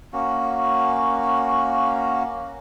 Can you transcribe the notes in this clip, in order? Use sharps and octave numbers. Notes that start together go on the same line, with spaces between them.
A#3 C#4 F#4